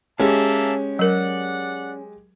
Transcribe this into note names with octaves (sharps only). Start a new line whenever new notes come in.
G#3 A#3 C#4 G4 E5 A5
F#3 A#4 D5 F#5